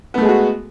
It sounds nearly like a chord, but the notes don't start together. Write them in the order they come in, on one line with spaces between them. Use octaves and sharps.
B3 A3 G#3 G#4 F#4